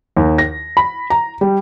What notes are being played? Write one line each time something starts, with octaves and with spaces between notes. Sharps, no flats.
D#2
A#6
B5
A#5
G3